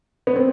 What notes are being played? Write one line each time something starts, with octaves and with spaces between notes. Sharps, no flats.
B3
C4